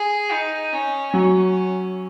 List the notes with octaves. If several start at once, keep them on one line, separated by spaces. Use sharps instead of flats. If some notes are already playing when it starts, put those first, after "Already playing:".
Already playing: G#4
D#4
C#4
F#3 C#4